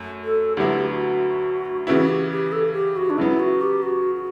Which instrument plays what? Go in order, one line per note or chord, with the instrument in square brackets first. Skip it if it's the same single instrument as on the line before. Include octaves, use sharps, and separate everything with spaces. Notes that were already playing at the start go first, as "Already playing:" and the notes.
Already playing: [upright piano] F#2 A3
[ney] A4
[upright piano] D2 D3 F#3 B3 E4 [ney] G4
[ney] F#4
[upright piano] C#3 E3 B3 E4 [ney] F#4
[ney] G4
G4
A4
G4
F#4
D4
[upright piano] C#3 F#3 B3 [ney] E4
[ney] F#4
G4
F#4
F#4